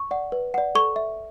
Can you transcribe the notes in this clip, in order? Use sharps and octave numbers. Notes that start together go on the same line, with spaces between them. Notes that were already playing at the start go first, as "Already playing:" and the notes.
Already playing: C#6
D5 F#5
B4
D5 F#5
A4 C#6
E5